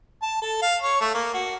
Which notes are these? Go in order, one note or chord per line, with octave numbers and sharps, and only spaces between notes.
A5
A4
F5
C#5
A3
A#3
F#4